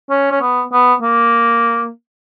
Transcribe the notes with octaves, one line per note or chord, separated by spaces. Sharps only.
C#4
C#4
B3
B3
A#3